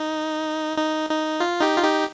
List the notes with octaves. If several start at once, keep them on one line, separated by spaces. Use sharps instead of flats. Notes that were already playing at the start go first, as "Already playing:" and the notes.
Already playing: D#4
D#4
D#4
F4
D#4 G4
F4
D#4 G4